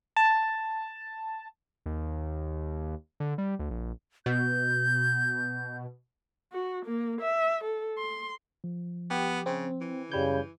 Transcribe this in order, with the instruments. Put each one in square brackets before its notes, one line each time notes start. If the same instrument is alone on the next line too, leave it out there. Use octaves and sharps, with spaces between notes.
[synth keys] A5
[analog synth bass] D#2
D3
G3
D2
A#1
[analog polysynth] B2 [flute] G6
[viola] F#4
A#3
E5
A4
C6
[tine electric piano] F3
[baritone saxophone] B3 [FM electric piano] G4
[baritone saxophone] C#3 [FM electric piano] C4
[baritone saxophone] E3
[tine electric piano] F#2 B5 G#6 [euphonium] C#3 [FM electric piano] G3 G6